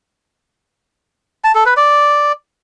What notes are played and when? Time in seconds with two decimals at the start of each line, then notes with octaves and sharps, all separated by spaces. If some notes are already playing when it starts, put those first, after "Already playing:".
1.44 A5
1.55 A4
1.66 B4
1.77 D5